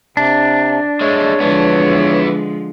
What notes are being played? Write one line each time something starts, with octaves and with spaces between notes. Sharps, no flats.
C3 D4
G#3 A3 C#5
D3 E3 F3 G#3 B3